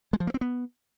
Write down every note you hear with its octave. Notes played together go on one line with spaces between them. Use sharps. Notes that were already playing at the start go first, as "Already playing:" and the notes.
G#3
F3
A#3
C4
B3